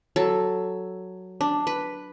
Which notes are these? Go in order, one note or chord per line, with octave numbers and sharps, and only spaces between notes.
F#3 A4
D4
B4